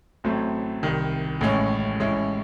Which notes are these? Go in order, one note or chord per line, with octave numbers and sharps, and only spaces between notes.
A1 A2 F#3 A3 C4
C2 C3 D#3
A1 A2 G#3 C#4
A1 A2 G#3 C#4 E4